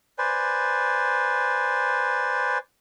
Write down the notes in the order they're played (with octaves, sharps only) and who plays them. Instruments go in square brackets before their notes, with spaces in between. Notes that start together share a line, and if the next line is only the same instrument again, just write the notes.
[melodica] B4 C5 D5 G#5